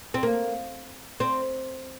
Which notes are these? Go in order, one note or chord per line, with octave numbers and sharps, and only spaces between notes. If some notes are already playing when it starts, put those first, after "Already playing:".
C4
A#3
C4